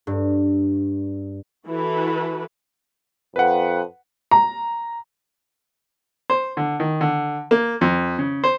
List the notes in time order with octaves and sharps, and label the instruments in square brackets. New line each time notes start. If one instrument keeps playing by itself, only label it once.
[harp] G2
[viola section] E3 F#4 A4 B4
[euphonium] F2 [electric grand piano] B4 F#5
[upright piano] A#5
[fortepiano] C5
D3
D#3
D3
A#3
F2
C#3
C5